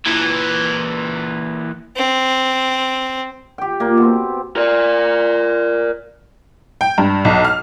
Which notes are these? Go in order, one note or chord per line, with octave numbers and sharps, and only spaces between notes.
A#2 E3
C4
G4 G5
A#2 A#3
B2 C4
A#4 D5
G5
G2
B1
F6